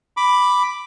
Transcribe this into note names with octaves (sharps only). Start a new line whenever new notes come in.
B5 D6